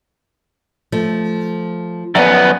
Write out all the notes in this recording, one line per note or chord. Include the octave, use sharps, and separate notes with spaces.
F3 A3
F#2 F3 B3 D5 G#5